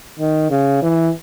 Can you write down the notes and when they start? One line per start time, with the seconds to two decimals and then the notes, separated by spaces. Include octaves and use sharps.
0.19 D#3
0.50 C#3
0.82 E3